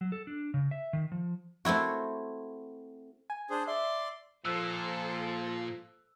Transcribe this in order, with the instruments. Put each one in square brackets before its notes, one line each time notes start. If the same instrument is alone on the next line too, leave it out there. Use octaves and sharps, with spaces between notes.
[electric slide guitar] F#3
A4
D4
C#3
E5
D#3
F3
[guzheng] A3 C4 E4 F#4
[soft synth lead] G#5
[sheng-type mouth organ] D4 G#4 C5
[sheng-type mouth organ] D5 C6 [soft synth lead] E5
[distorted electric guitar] A#2 [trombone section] F3 [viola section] A4 C5 [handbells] E6 F#6